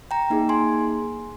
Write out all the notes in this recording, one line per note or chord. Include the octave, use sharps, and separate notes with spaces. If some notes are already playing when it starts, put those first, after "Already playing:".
G5 A#5
A#3 D#4 G#4
G#5 C6